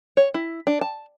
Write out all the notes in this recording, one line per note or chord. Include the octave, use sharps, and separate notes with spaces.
C#5
E4
D4
A5